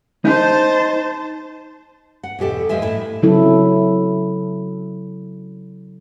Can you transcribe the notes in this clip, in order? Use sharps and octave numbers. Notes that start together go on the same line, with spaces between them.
D#4 C5 A5
F#5
E2 B2 G4 A4
E2 F3 G#3 E5 G#5
A2 E4
C#3 F#3 C4 E4 A4